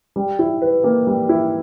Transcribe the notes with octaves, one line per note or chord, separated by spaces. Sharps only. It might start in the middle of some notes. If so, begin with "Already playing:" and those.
G3
E4
B4
A#3
G3
E4